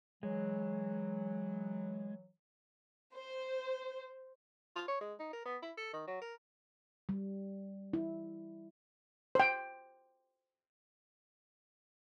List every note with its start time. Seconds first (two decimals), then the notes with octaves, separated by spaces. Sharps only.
0.23 E3 F#3 G#3
3.14 C5
4.76 F4
4.88 C#5
5.01 G#3
5.19 D#4
5.33 A#4
5.46 B3
5.63 E4
5.78 A4
5.93 D#3
6.07 F#3
6.22 A#4
7.09 G3
7.93 E4
9.35 C5 G5